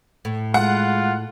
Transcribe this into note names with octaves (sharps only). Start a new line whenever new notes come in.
A2
G#3 F4 F#5